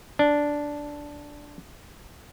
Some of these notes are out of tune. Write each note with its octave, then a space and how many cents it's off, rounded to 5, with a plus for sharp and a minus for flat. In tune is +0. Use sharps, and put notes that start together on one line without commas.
D4 -5